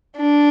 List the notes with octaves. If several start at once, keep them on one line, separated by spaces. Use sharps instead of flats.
D4